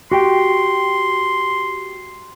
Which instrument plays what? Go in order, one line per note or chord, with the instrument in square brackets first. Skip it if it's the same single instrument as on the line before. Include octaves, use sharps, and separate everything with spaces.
[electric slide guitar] F#4 G4 G5 [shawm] C6